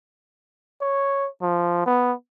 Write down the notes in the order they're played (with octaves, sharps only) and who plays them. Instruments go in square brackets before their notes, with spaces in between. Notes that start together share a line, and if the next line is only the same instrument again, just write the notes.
[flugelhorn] C#5
F3
B3